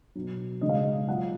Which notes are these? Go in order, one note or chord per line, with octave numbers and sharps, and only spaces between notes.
B2 F#3
C#3 G#3 D#5
F5
D#5
A#2 F#3 F#5